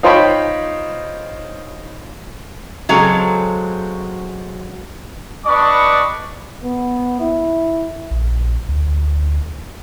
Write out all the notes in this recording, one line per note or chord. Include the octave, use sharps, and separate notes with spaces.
D#4 F4 C5 C#5 G5 B5
C#3 F#3 G#3 C4 A4
G3 D4 B4 D5 D#5 C#6
B3
E4
A#1
D2